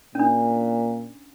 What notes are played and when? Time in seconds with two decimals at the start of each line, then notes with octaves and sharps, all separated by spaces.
0.15 A#2 C#4 D4